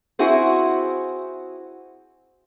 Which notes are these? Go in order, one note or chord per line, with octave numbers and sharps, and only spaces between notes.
C4 E4 F#4 G#4 C5